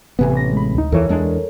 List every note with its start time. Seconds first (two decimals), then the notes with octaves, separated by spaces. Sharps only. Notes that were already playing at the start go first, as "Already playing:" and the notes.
0.19 A1 C3 B3 B4 G#5
0.37 A#6
0.52 G#3 B5
0.74 D2 D#4
0.92 E2 E3 A4 A#4 C#5
1.09 E2 G#3 D4